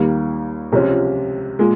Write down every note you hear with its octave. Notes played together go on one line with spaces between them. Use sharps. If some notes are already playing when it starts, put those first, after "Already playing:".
Already playing: D#2 D#3 G3 A#3
C#2 C3 F3 G#3 C#4
A#2 G#3